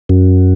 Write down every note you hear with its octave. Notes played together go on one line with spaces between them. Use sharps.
F#2